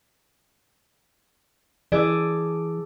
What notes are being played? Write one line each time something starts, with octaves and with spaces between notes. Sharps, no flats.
E3 G#4 A4 D5